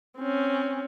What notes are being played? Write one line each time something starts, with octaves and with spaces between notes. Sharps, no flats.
C4 C#4